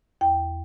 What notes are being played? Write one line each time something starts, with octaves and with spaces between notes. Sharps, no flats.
E2 G5